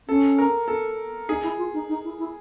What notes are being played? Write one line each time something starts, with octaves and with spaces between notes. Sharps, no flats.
C#4 A4
A#4
A4
D#4 G#4
E4
F4
D#4
D#4
E4
E4